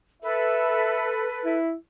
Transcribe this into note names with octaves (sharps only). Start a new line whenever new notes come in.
A4 B4 E5
E4